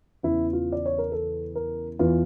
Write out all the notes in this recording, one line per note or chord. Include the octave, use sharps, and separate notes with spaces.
E2 C#3 E3 E4
F4
D5
C#5
A#4
A4
A#4
E2 E3 F4